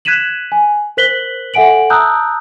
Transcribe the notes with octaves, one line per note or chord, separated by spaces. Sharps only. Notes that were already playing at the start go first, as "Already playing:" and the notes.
F#6 G#6 B6 D#7 E7 F#7
G#5
A#4 C5 F#6 B6 F#7 G7
A4 E5 F#5 G#5 D7 F#7
A5 A#5 D#6 E6 F#6 G6